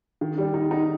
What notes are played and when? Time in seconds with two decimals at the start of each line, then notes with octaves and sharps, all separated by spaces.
0.21 D#3
0.38 G3
0.54 D#4
0.71 D#4